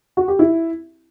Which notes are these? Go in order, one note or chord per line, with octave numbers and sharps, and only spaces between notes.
F#4
G4
E4